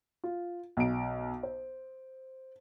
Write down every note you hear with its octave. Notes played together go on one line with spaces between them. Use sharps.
F4
B1 D7
C5